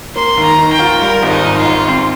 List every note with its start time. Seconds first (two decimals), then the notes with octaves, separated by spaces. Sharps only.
0.16 A#3 C6
0.37 D#2
0.43 A#5
0.59 D#3
0.73 G5
0.79 F4
1.00 G3 A#4
1.23 G#1
1.29 D#4
1.44 G#2
1.58 F4
1.66 G#1
1.87 C4